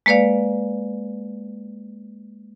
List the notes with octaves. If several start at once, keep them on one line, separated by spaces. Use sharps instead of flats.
G#3 A#3 B4 D5 F5